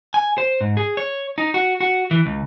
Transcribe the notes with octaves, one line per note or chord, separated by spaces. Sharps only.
G#5
C5
G#2
G#4
C#5
D#4
F#4
F#4
E3
C#2